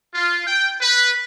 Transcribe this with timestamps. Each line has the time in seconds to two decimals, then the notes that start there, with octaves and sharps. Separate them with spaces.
0.14 F4
0.47 G5
0.81 B4